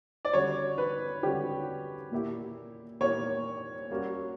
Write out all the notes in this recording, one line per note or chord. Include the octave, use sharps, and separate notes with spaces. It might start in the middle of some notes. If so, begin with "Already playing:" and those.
D5
D3 G3 C#4 F#4 C#5
B4
D3 G3 C#4 F#4 G4
A#2 A#3 E4 G4
A#2 A#3 E4 G4 C#5
G3 A#3 C#4 F#4